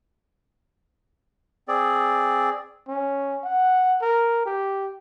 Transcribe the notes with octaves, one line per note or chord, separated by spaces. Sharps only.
C4 G#4 D5
C#4
F#5
A#4
G4